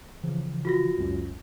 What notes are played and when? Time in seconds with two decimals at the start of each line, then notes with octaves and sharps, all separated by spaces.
0.24 C#3 E3 F3
0.65 F4 F#4 A#6
0.98 C#2 F#2